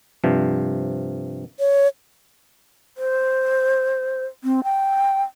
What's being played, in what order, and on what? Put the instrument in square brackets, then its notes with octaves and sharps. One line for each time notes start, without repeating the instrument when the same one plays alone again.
[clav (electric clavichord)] G2 C3 F3
[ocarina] C#5
[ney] C5
C4
G5